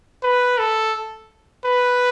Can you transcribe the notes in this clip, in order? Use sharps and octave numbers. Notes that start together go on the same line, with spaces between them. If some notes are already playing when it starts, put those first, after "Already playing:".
B4
A4
B4